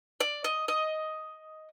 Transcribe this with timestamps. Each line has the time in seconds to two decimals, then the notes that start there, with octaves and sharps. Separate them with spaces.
0.20 D5
0.44 D#5
0.68 D#5